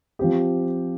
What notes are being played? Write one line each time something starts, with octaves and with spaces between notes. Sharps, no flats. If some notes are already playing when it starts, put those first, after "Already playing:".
F3 C4 G4